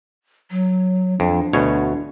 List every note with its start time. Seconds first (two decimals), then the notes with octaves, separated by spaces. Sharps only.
0.51 F#3
1.20 F2 D4
1.53 D2 B2 C#5